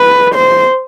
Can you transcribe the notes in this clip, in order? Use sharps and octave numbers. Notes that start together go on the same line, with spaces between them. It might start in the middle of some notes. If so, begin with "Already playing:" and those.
Already playing: B4
C5